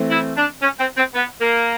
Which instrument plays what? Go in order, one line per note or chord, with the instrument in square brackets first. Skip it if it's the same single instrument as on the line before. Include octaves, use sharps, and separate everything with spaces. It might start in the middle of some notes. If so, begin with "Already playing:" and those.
Already playing: [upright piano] E3 A3 C4
[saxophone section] E4
D4
C#4
C4
C4
B3
A#3